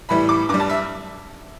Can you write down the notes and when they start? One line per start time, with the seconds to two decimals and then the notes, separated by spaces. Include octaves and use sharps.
0.09 A2 E3 G3 B5
0.29 D6
0.49 G2 D6
0.54 G3
0.60 A5
0.69 E5